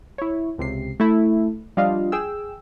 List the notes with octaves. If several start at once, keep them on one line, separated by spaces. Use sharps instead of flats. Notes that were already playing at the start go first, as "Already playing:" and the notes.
E4 C#5
C#2 C3 C7
A3 E4
F3 G3 D4 F4 D#5 F5
G#4 G5 E6